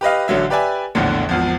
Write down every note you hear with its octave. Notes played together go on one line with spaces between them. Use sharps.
G4 B4 D#5 F5
A1 D3 F#3 E5
G4 B4 D5 E5 G#5
A#1 E2 A2 D3
G#1 E2 F3